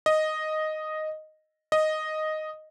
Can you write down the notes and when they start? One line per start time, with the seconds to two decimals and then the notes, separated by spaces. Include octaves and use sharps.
0.06 D#5
1.72 D#5